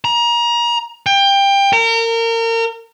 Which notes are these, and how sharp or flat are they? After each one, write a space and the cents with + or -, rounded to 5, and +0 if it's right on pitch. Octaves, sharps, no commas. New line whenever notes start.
A#5 +30
G5 +20
A#4 -30